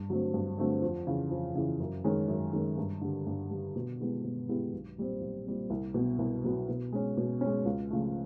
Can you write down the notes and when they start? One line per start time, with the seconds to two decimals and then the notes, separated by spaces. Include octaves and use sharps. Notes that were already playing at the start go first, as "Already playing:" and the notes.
Already playing: G2
0.09 D3 F#3 A3 C4
0.34 G2
0.58 D3 F#3 A3 C4
0.82 F2
1.07 C#3 E3
1.30 F2
1.55 C#3 E3
1.80 F#2
2.04 D#3 G#3 C#4
2.28 F#2
2.53 D#3 G#3 C#4
2.77 G2
3.01 D3 G3
3.27 G2
3.51 D3 G3
3.76 B2
4.00 G#3 B3 E4 G4
4.24 B2
4.49 G#3 B3 E4 G4
4.73 B1
4.98 A#2 G3 C4
5.21 B1
5.46 A#2 G3 C4
5.70 C2
5.94 B2 F#3 B3
6.19 C2
6.44 B2 F#3 B3
6.69 B2
6.92 G#3 C#4
7.17 B2
7.41 G#3 C#4
7.65 C#2
7.90 C#3 F3 A3